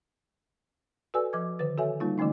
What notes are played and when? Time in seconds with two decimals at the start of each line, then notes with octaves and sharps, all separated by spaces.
1.14 F#4 A4 B4 D5 G#5 E6
1.33 F3 D6 G#6
1.59 D3 D#3 B4 A6
1.78 F#4 A4 C#5 E5 G#5
2.00 G3 A#3 D#4 F4
2.18 D3 E3 F3 A3 C#4 D#4